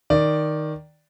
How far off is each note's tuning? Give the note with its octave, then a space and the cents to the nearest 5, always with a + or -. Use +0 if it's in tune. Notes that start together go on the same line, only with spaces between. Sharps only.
D#3 +0 D5 +0